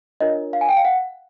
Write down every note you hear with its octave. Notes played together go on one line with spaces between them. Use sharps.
D4 F4 A#4 C#5 D#5
F5
G#5
G5
F5
F#5